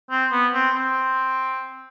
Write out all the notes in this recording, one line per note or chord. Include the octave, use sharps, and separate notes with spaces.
C4
B3
C4
C4